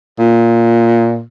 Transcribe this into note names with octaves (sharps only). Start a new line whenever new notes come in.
A#2